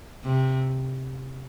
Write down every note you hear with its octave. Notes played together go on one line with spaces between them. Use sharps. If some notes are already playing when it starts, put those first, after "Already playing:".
C3